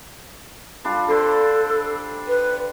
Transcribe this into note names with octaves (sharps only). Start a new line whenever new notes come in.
G3 D4 F4
D3 A4 C5
B4